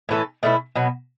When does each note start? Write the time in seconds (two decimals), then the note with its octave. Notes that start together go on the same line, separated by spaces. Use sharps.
0.09 A2 E3 C#4 A4
0.43 B2 A3 C#4 E4
0.75 B2 F#3 B3